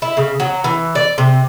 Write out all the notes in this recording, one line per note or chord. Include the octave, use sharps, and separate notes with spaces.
E4
C#3
F#3
E3
D5
C3